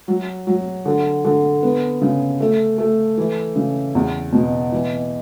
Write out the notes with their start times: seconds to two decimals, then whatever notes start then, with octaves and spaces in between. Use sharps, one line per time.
0.08 F#3
0.47 F#3
0.86 D3
1.25 D3
1.63 B3
2.02 C#3
2.40 A3
2.78 A3
3.18 E3
3.56 C#3
3.95 E2
4.33 B2
4.72 E3